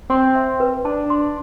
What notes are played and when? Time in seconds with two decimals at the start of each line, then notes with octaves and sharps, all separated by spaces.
0.10 C4 C6
0.35 E5
0.60 B4
0.85 D4 A5
1.10 C6